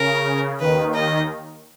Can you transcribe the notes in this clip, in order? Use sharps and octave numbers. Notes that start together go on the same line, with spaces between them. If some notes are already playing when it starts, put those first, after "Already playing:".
Already playing: C#3 A#4
D#2 D#3 B4
D#5